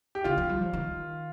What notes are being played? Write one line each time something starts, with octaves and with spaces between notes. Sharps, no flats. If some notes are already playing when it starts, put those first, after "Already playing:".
G4
D3 F4
F3
G3
F3
D#3